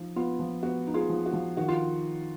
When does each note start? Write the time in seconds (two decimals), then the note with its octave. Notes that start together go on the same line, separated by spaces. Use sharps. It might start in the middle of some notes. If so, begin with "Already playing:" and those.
Already playing: F3 D#4
0.16 B3 F4
0.40 F3
0.63 B3 F#4
0.87 D#4
0.94 F4 G#4
1.10 F3
1.26 F#4
1.33 F3
1.57 D#3 F#4
1.68 F4